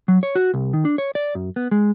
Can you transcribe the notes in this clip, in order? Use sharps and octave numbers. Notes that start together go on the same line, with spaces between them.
F#3
C#5
F#4
C2
D#3
D4
C#5
D5
F#2
B3
G#3